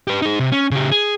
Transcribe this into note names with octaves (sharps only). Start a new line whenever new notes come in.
G4 B4
D#4 G#4
C3
C#4
C#3 G4
G#4